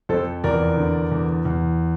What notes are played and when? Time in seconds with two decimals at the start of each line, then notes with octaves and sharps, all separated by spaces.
0.09 F2 A4 C5
0.44 E2 A#4 D5
0.77 D3
1.11 E2
1.45 E2